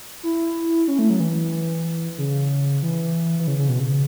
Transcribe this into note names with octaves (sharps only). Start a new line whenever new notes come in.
E4
C#4
A3
F#3
E3
C#3
E3
E3
C#3
C#3
B2
C#3